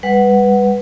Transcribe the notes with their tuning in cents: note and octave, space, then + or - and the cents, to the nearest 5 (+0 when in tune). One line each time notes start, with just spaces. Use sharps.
G3 +35 B4 +0 F#5 +0